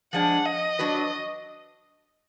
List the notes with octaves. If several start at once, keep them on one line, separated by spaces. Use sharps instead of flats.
F3 G#3 D4 G#4 F#5
D#5
F#3 D4 F#4 B4